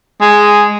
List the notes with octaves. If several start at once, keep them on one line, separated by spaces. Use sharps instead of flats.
G#3